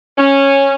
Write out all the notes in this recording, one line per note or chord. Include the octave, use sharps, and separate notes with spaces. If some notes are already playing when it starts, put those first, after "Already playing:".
C#4